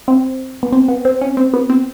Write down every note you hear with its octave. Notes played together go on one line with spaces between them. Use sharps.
C4
B3
C4
B3
C4
C#4
C4
B3
C4